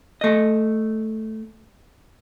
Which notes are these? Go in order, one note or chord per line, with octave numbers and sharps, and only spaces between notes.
A3 D#5